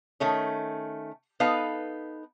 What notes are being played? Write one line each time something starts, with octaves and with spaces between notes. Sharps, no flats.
D#3 A3 C#4
B3 D#4 A4 B4 F5